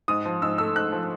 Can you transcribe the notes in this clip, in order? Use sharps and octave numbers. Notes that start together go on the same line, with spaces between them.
G#2 D#6
F3
G#2 E6
A3 E6
G#2 F#6
F3